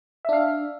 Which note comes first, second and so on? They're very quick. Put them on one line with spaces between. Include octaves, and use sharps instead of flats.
E5 D4 F5